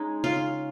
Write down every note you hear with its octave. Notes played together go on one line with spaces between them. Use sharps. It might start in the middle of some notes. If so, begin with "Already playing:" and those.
Already playing: G#3 C#4 D#4
C#3 F4